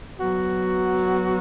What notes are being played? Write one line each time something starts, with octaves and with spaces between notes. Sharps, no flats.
F#3 B3 F#4